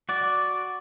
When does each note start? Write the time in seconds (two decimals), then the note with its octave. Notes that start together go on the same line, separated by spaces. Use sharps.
0.09 F#4 D5